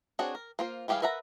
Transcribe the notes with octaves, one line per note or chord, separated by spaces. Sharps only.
C4 D4 F#4 G#4 C#5
A#4
A#3 F4 C5
E3 G3 G4 G#4 F5
A#4 B4 E5 F#5 A#5